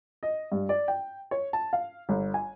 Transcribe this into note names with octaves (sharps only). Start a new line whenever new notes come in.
D#5
G2
D5
G5
C#5
A5
F5
G1
G#5